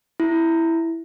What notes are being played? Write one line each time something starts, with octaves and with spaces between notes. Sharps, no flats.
E4